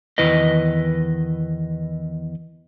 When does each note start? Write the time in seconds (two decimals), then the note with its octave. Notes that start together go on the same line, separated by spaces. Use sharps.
0.18 E2 D#3 E4 B4 D#5